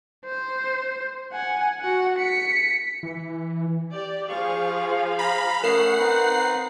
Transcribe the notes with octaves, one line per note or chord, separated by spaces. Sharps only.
C5
F#5 G#5
F#4 F#5
B6 C#7
E3
G4 D5
F3 G#4 F5 C#6
A#5 B5
A3 C#4 A#4 F#5 C7
C4 D#4 B4